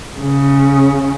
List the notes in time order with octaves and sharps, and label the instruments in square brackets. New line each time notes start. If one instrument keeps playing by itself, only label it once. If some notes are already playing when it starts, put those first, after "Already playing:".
[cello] C#3